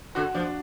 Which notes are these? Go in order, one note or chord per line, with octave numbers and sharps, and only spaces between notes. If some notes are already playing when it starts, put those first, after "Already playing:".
D3 F#4
F3 D4